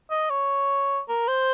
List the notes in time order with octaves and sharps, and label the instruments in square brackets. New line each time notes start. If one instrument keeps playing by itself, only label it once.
[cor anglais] D#5
C#5
A#4
C5